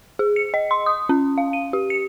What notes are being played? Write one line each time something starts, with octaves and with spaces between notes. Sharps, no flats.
G#4
C#7
D#5
C6
D#6
C#4
F5
D#7
G4
C#7